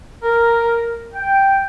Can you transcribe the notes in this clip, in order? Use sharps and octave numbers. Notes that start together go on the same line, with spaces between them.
A#4
G5